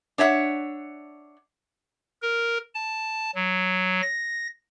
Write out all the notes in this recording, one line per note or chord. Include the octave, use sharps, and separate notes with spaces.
D4 C#5 E5 F#5
A#4
A5
F#3
A#6